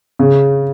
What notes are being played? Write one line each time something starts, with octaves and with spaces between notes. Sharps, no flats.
C#3